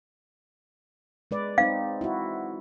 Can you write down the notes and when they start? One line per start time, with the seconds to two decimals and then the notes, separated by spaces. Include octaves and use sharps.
1.31 G#3 B4 D5
1.58 C4 D#4 F5
2.01 E4 F#4